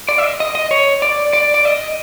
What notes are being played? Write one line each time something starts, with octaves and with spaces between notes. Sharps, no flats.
D5
E5
D#5
D#5
D#5
C#5
D5
D5
D5
D#5